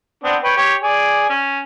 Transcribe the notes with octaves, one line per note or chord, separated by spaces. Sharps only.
B3 C4 D4
B4 C#5 G5
G4 C#5
G#4 D5
C#4